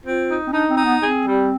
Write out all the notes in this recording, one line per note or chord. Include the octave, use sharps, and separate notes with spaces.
C4 F4
D#4
C4
D4 D#4
C4
D#4
B3
C4 G#4
G3